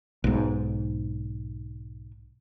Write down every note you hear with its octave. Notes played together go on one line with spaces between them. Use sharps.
B1 G#2